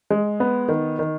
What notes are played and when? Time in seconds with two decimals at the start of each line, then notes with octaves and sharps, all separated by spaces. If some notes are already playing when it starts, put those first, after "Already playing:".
0.10 G#3
0.40 B3
0.69 D#3
0.99 D#3